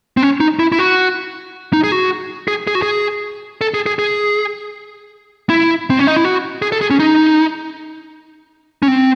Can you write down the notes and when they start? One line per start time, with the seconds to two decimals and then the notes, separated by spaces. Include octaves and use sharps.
0.17 C4
0.23 C#4
0.40 D#4
0.59 E4
0.72 E4
0.79 F#4
1.73 D#4
1.84 G#4
1.92 F#4
2.48 G#4
2.67 G#4
2.75 F#4
2.82 G#4
3.61 A4
3.74 G#4
3.86 G#4
3.99 G#4
5.50 E4
5.90 C4
5.99 C#4
6.07 D#4
6.17 E4
6.24 F#4
6.62 G#4
6.72 A4
6.81 G#4
6.90 C#4
6.99 D#4
8.82 C#4
8.88 C4